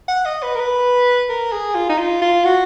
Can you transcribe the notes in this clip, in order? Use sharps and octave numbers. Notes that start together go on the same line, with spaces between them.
F#5
D#5
B4
A#4
B4
A#4
G#4
F4
D#4
F4
F4
F#4